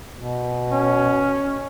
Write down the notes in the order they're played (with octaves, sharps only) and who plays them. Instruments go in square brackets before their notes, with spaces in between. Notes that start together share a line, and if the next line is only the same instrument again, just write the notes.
[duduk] B2
[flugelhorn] C#4